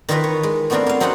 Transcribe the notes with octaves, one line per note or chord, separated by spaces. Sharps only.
D#3 E3 D#4 F4 A#4 B4
C#5
G#3
A3 B3 C4 D4 F4 A#4
A#3 F5
F#3 C4 C#4 D#4 F4 F#5